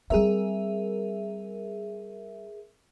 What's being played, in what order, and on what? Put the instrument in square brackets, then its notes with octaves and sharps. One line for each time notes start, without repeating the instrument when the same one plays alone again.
[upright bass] G3 C4 [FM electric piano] G#4 A#4 E5